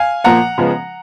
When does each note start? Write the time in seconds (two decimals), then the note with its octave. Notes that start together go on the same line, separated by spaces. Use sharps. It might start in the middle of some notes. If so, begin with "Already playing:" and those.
Already playing: F5 G#5
0.24 A#2 F3 A#3 F#5 A#5
0.58 C#3 F3 G#3 B3